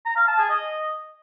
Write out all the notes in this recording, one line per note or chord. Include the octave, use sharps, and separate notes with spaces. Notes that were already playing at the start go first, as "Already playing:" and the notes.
A#5
F5
A5
G#4
D#5